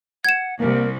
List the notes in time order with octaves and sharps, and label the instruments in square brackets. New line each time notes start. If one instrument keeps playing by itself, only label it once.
[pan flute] F#5 [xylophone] G#6 E7
[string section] C2 [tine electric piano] A#3 [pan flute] A#4